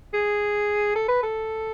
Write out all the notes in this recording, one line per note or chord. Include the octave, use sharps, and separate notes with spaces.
G#4
A4
B4
A4